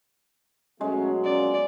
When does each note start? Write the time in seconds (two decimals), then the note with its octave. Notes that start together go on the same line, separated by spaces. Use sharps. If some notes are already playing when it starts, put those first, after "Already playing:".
0.81 B2 F#3 G#3 A3 C#4
1.24 F2 A#3 C#4 D5